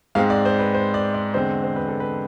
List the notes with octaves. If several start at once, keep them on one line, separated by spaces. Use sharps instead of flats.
G#2 G#3 C4 F5
D5
C5
B4
C5
D5
D5
E2 D3 G#3 C4 C5
C5
B4
A4
B4